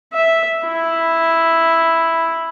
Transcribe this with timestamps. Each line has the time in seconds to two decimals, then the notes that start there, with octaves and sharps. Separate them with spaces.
0.13 E5
0.66 E4